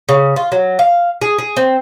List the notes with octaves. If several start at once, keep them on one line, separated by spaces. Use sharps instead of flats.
C#3
F4
F#3
F5
G#4
G#4
C4